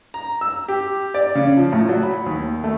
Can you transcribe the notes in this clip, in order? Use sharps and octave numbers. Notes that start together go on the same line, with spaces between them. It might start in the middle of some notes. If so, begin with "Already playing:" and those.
A#5
E6
G4
D5
C#3
F3
A2
F#3
B5
D#2
A3